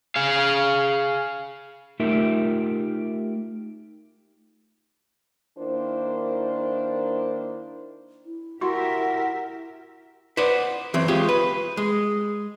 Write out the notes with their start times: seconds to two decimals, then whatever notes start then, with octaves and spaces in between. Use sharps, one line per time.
0.16 G#4 F5
2.00 A3 D#4 F4 G4 A#4 E5
5.59 D#3 A#3 D4 E4 A#4 C5
8.26 E4
8.61 E4 F#4 G4 A#4 E5 F#5 C6
10.37 B4 C5 D5 F#5
10.94 E3 F#3 C4
11.08 G#3 F4 G4 C#5
11.29 B4
11.77 G#3